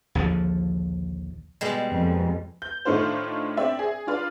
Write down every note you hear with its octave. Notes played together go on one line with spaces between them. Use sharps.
A#1 D#2 D3 F3
B2 G3 G#3
F2
G6
A2 D#3 A3 D4 F4 C5
C4 D5 E5
G#4
D4 F4 B4 D5